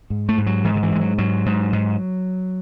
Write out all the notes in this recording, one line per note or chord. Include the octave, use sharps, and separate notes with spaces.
G#2
A3
G#2
F#3
G#2 E3
D3
E3
G#2 G#3
F#3
G#2 F#3
G#2
G#2